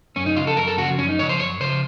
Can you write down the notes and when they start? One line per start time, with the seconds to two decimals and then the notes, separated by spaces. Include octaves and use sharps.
0.16 F#2 C#4
0.26 D#4
0.37 C#3 F3 F4
0.47 A4
0.57 F#2 A#4
0.68 A4
0.78 C#3 F3 F#4
0.98 F#2 C#4
1.09 D#4
1.19 C#3 F3 C#5
1.29 C5
1.40 F#2 C#5
1.60 C#3 F3 C5